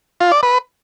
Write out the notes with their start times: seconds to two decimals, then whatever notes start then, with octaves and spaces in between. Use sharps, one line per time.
0.20 F4
0.32 D5
0.43 B4